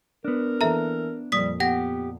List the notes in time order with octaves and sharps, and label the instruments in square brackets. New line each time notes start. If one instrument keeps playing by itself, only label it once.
[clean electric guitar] B3 D4 [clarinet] A#4
[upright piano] E3 A#3 A4 [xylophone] E5 A#5
[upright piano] F2 A#2 [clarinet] G3 [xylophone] D#6 B6
[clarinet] B3 [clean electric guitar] G4 [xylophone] F#5 A#6